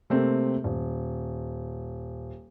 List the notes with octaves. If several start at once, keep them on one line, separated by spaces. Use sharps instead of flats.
C3 A3 A#3 C4
D#1